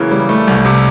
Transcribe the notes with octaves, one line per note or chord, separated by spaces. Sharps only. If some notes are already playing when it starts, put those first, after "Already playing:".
Already playing: C#3 E3 F#3 A#3
G3
A3
C2
C3